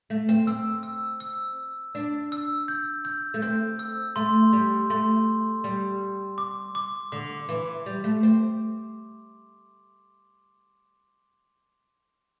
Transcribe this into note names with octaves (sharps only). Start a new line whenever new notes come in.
A3
C4
C4 E6
E6
E6
D4
E6
G6
G6
A3
C4 G6
E6
A3 C6
G3
A3 C6
G3
D6
D6
D3 D6
E3
G3
A3
C4